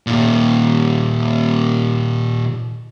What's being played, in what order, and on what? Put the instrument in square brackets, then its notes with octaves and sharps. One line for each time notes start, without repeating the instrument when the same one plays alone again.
[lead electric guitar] A#2 D#3